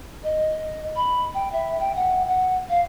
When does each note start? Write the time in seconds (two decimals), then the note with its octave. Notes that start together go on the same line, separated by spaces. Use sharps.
0.24 D#5
0.96 B5
1.34 G5
1.53 E5
1.80 G5
1.96 F#5
2.28 F#5
2.69 F5